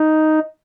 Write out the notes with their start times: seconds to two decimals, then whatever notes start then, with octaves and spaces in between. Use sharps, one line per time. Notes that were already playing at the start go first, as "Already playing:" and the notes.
Already playing: D#4